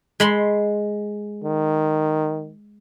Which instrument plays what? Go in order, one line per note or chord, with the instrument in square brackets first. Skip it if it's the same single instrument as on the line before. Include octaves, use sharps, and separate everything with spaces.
[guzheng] G#3 B5 C6
[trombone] D#3